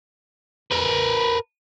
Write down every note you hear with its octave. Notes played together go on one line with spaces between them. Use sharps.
A#4 B4